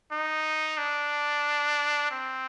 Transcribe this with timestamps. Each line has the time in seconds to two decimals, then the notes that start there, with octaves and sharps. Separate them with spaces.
0.12 D#4
0.78 D4
2.11 C4